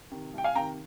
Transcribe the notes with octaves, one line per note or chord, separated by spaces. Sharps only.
C3 D#3
C2 G5
F5 G#5
C3 D#3 G5 A#5